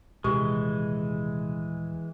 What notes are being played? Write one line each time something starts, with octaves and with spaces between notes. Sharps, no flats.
D#1 C3 E3 G#3 G4